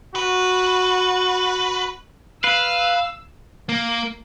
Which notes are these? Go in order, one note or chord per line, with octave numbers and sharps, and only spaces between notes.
F#4 B4
B4 F5 E6
A#3